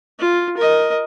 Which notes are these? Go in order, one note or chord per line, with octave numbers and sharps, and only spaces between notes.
F4
A#4 D#5